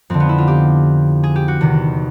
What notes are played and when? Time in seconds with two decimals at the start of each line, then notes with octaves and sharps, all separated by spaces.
0.10 F2 D3 C4
0.20 B3
0.29 E4
0.38 F4
0.47 G4
1.23 G#4
1.36 G4
1.48 F#4
1.61 E2 C3 D#3